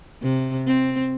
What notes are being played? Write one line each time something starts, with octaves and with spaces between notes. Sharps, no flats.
C3
C4